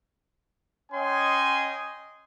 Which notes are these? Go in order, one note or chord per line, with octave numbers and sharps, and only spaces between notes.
C#4 C#5 D#5 G5 G#5 C6